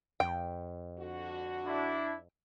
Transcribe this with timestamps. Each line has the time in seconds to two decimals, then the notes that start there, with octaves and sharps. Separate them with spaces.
0.20 F2 G5
0.98 D3 F#4
1.65 D4 E4